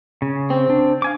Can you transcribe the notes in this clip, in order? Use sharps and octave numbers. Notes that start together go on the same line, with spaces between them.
C#3
C4
D4
F5 G#5 D6